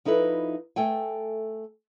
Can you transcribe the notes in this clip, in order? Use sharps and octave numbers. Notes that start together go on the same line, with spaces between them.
F3 D#4 E4 A4 B4
A3 A4 G5 G#5